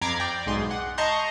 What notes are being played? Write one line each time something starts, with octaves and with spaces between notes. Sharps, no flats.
F2 A#5 B5 D6 G#6 C7
D5 G5
B1 G#2 G#4 C6
F#5
D#5 A5 A#5 C6 C#6 G6